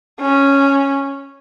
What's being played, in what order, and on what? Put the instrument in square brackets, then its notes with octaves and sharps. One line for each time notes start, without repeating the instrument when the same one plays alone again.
[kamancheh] C#4